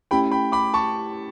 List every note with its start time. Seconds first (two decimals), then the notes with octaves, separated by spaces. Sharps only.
0.11 A3 C#4 E4 G4 G5 B5
0.31 G5 B5
0.52 B5 D6
0.74 A5 C#6